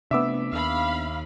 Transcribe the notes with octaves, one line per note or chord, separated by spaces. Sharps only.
C3 A3 B3 D4 E5 D6 E6
D#2 F5 B5